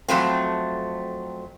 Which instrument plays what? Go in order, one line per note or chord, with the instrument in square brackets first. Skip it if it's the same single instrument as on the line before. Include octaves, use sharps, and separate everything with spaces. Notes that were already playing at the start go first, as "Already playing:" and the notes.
[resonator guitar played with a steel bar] F2 F#3 A3 C4